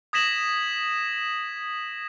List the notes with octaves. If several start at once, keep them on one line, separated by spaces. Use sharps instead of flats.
D#6 G#6 A#6 B6 E7 F#7